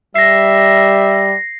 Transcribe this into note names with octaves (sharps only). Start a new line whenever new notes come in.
G3 E5 A#6 C7